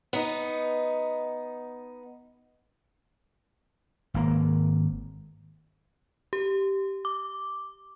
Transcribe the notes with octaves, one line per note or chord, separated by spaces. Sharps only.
B3 D#4
G#1 A#3
G4
D6